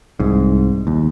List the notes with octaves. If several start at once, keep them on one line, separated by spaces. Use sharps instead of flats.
C2 G#2
D#2